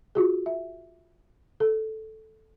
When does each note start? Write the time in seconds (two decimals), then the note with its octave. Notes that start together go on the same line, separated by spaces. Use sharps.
0.15 F4 F#4 G#4
0.46 E5
1.60 A4